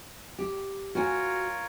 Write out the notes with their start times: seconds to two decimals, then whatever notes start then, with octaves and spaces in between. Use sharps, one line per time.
0.39 G4
0.95 F4 F#4 A#4 C#5 G#5